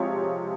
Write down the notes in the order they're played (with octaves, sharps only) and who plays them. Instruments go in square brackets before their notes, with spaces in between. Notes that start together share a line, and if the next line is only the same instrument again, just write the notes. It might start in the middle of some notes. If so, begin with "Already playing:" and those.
Already playing: [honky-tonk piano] C3 F3 G#3 C#5